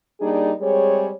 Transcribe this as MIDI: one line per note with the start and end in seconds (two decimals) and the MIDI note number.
0.21 0.51 55
0.21 0.51 58
0.21 0.51 62
0.21 0.51 63
0.21 0.51 68
0.21 0.51 74
0.61 1.12 55
0.61 1.12 56
0.61 1.12 60
0.61 1.12 68
0.61 1.12 73